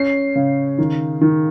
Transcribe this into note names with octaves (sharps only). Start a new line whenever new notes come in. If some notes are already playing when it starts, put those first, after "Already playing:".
Already playing: C#4 C7
C#3
D#3
D#3